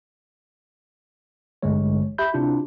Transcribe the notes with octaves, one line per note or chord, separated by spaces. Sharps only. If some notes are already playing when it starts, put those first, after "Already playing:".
A1 G2 D3 G#3 A3 C#5
G4 E5 B5 G6
C3 D4 E4 F4